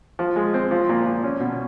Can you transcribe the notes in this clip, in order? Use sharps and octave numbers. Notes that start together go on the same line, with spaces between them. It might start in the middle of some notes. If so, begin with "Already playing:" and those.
F3
G#3
C4
F3
A#2
A#2
C#4
B2